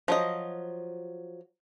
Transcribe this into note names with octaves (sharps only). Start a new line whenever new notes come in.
F3 F#3 D#5